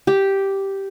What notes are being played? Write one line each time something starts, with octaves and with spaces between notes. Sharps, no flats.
G4